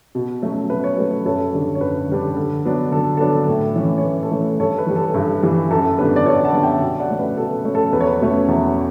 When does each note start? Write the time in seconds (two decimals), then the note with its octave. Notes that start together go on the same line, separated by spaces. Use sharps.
0.15 B2
0.42 F#3 A3 C#4
0.70 B2 B4
0.84 C#5
0.97 F#3 A3 C#4 B4
1.25 F#2 A4 C#5
1.54 D3 G3 D4
1.75 C#5
1.81 F#2 B4
2.09 D3 G3 D4
2.36 D3
2.65 F#3 B3 D4
2.92 D3 A4
3.17 F#3 B3 D4 A4
3.48 A2
3.76 E3 A3 C#4
3.98 C#5
4.03 A2 B4
4.23 A4
4.31 E3 A3 C#4
4.41 B4
4.59 G2 A4 C#5
4.78 B4
4.87 E3 G3
4.96 A4
5.14 G2
5.42 E3 G3
5.71 F#2 A4
5.99 D3 G3 B3 D4 B4
6.16 D5
6.26 F#2 A4 C#5
6.45 F#5 A5
6.54 D3 G3 B3 D4
6.63 E5 G5
6.81 B2
7.00 D5 F#5
7.10 A3 C#4
7.19 B4
7.37 B2 A4
7.65 A3 C#4
7.75 A4
7.92 E2 B4
8.00 C#5
8.07 B4
8.21 B2 A3 C#4
8.48 E2